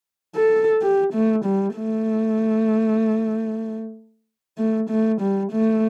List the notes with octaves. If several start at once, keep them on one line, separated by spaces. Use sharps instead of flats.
A4
G4
A3
G3
A3
A3
A3
G3
A3